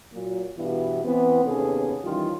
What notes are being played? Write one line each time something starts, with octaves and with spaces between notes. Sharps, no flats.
A#2 F#3
G2 B2 E3 G3 B3 E4
E3 B3 C4
D#2 C3 B3 C#4 G#4 A4
D#3 E3 G3 C#4 F4